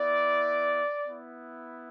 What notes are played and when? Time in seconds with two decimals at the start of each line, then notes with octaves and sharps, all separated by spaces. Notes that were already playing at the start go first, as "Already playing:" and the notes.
Already playing: B3 E4 D5
1.08 B3 E4